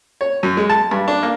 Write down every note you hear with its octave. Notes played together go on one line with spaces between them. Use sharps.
C#5
F#2
G#3
A5
G2
D4
A#3